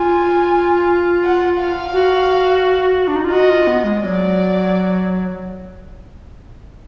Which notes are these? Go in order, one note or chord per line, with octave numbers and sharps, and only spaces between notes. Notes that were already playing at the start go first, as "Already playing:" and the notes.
Already playing: F4 G#5
F#5
F5
F#4
D4
D#4
F4
F#4 D#5
F4
B3
G#3
F#3 G#3 D5